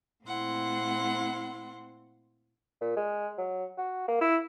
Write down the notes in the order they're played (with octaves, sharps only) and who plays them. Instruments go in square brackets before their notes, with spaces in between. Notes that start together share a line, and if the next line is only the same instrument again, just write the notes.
[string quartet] A#2 A3 C4 E4 F#5 C6
[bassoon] A#2
G#3
F#3
F#4
A#3
E4